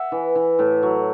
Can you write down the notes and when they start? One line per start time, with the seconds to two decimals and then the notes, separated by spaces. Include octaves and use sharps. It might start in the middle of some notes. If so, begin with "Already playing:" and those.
Already playing: E5 F#5
0.12 E3
0.35 E3
0.59 A2
0.83 F#3